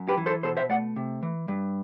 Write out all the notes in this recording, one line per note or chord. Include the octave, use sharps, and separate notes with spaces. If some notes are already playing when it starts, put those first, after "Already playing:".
Already playing: F#2
G4 B4
E3
A4 C5
B2 A4 C5
C5 E5
A3 D5 F#5
C3
E3
G2